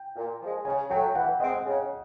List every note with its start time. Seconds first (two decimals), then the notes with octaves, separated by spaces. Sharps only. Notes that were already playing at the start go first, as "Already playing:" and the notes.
Already playing: G5
0.16 A#2
0.41 F3 G#3
0.65 C#3 G#5
0.90 F#3 G5
0.95 A3
1.15 E3 F#5
1.40 G#3 C4 D#5
1.66 C#3